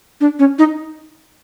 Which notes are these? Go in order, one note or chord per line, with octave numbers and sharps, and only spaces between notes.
D4
C#4
D#4